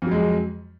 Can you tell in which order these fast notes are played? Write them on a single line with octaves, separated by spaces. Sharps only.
F2 F#3 G#3